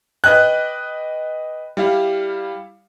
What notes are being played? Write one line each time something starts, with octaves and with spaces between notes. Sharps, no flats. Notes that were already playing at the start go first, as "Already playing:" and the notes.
B4 D#5 G5 F#6
G3 E4 F5